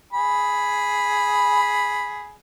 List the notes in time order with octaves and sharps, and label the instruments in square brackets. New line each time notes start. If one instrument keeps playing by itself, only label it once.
[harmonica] G#4 B5